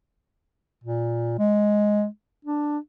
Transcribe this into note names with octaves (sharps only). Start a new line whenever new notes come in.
A#2
G#3
D4